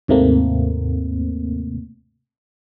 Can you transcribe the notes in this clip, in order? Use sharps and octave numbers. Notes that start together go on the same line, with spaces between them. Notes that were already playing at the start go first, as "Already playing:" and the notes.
D#2 G#2 C3 A3 A#3 C4